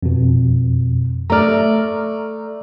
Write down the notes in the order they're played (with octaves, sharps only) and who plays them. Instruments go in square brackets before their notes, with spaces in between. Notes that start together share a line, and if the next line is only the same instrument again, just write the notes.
[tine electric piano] F2 B2
[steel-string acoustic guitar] A3 D5 [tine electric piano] A#5 F6